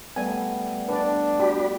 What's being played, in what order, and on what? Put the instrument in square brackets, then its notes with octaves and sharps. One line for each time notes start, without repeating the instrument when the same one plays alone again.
[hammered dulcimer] G3 A3 B3 [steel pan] G#5
[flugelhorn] D4 [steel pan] B4 D5
[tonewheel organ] F#4 D5 B5 [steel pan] G4